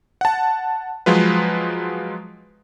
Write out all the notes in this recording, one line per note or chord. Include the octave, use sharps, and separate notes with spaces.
F#5 A5
F3 F#3 G#3 F4 B4